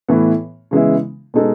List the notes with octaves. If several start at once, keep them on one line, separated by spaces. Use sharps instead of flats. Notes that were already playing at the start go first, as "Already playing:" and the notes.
A2 E3 B3
C#3 E3 G#3 B3 E4
B2 G#3 D#4 A4